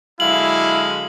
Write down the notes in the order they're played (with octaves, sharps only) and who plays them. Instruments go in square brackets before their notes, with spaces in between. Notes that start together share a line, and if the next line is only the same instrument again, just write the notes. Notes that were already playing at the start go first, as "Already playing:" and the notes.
[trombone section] D3 F#3 G#3 [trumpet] E4 [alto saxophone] F5 [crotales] F#7